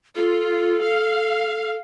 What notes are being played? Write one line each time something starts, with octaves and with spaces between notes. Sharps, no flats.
F4 A4
F5